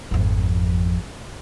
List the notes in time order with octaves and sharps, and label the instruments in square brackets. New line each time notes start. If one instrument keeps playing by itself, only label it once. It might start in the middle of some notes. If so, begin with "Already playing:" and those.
[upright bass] G#1 F2